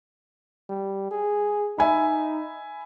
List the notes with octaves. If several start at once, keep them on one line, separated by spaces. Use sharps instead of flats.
G3
G#4
D#4 E5 G#5 B5